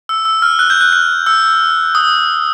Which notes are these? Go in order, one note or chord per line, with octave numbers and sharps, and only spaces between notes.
E6
E6
F6
F#6
G6
F#6
F#6
E6
D#6